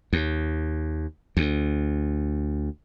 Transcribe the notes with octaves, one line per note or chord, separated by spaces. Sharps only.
D#2
D2